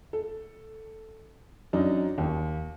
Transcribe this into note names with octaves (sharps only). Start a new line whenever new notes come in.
A4
F#2 D4 D#4
D#2